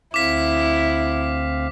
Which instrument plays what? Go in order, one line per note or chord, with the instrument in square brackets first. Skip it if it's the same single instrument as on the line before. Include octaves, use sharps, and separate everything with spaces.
[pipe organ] D2 C4 F5 [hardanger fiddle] E4 [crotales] D6 B6